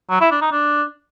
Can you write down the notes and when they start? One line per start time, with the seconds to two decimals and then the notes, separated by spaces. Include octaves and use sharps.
0.11 F#3
0.21 E4
0.31 D4
0.42 D#4
0.52 D4